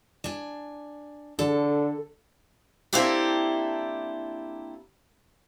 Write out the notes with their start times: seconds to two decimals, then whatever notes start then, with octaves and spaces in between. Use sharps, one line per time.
0.24 D4 G#5
1.39 D3 A4
2.93 A#3 C4 D4 E4 G4 A4